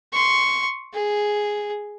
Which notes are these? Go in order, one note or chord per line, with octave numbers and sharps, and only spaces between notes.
C6 C#6
G#4